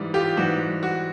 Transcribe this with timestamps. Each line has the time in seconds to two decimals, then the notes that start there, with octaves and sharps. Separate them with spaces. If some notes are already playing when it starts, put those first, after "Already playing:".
Already playing: G#2 E3 G3
0.14 F4 G4
0.37 G#2 E3 G3 F#4
0.83 F#4